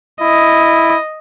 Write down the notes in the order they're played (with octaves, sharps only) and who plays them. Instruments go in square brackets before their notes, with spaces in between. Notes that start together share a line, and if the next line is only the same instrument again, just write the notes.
[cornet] E4 [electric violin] D#5